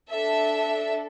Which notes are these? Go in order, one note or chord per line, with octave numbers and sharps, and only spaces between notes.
D4 A4 E5